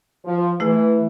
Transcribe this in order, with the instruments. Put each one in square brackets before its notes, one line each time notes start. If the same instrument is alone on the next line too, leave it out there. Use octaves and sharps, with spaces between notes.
[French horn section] F3
[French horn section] E3 [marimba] A3 E4 G#4